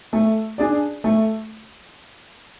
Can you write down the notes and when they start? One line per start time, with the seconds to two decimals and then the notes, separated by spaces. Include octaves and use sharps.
0.13 A3
0.58 D4 G#4 D5
1.04 A3